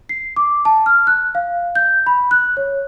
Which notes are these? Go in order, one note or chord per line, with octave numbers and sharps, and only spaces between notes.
C7
D6
A5
F6
F#6
F5
G6
B5
F#6
C#5